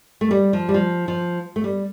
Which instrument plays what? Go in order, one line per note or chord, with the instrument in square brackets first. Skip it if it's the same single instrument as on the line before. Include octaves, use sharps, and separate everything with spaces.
[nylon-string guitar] A3
G3
F3
G3
F3
F3
A3
G3